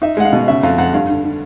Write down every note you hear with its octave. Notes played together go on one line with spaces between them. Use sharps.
D#4 E5
G#3 F#5
F5
B2
C#3 E5
F2 F5
F2 F#5
G2 F5
D3
D3